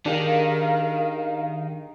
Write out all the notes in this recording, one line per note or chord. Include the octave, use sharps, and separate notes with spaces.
D#3 D4 G4 G#4 A#4 F5